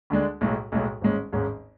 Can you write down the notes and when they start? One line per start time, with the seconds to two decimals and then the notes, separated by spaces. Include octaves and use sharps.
0.10 D2 D3 G#3 D4
0.41 B1 A2 G#3
0.72 B1 A2 G#3
1.01 G#1 G#2 G#3 C#4
1.33 G#1 G#2 G#3 C#4